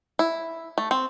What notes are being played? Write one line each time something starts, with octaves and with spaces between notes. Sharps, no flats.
E4
A3
C4